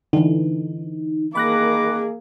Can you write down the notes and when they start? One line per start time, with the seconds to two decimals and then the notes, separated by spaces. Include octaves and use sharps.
0.13 D3 E3 D#4
1.35 D#3 A#3 G#4 B5 D6 F#6 A#6